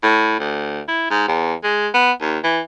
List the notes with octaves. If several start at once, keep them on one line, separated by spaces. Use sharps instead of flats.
A2
D2
E4
G#2
E2
G#3
B3
D#2
E3